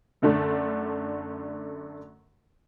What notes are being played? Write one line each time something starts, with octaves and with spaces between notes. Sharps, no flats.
F#2 D3 A3 D4